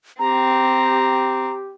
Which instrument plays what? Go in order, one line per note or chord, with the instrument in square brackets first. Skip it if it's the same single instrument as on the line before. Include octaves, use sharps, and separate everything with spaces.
[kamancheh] C4 [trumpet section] G4 [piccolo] A#5